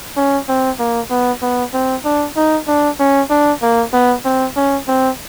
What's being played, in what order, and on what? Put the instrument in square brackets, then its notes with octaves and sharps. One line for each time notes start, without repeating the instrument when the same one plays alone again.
[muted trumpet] C#4
C4
A#3
B3
B3
C4
D4
D#4
D4
C#4
D4
A#3
B3
C4
C#4
C4